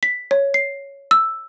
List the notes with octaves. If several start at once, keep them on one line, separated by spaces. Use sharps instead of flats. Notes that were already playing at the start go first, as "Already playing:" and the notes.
B6
C#5
C7
E6